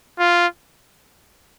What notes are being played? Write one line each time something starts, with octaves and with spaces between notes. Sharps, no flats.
F4